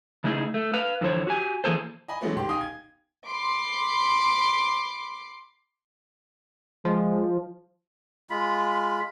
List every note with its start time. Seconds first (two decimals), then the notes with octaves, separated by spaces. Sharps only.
0.24 C#3 A3 D#4 E4 G#4
0.54 A3
0.74 B4 F5
1.01 F2 D3 E3 C5 C#5
1.27 F#4 G4 G#5
1.64 E3 A#3 G#4 A4 C5
2.08 D#5 G#5 B5
2.21 E3 F#3 G#3 A3 B3 C#4
2.36 E1 D#3 G4 C6
2.49 D#4 F5 G5 G#5 D#6
2.61 G#6
3.29 B5 C6 D6 C7
6.85 F3 G#3
8.30 G#3 F4 B5